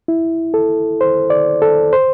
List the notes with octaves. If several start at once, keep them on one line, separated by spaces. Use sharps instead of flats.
E4
A4
C5
D5
A4
C5